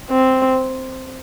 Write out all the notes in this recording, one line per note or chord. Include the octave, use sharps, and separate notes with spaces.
C4